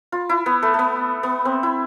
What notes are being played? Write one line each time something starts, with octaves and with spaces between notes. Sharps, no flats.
F4
E4
B3
A3
A3 B3
B3
C4
E4